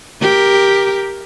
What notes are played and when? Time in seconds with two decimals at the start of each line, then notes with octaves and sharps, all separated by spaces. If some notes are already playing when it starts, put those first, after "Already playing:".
0.21 G4 A#4